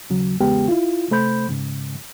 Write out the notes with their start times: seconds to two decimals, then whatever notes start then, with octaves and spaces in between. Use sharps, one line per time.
0.10 D#2 C#3 F#3
0.40 E2 C#3 G#3 B3 G4 G5
0.68 E4 F4
1.11 C3 A3 C5 B5 G6
1.49 G#2 C#3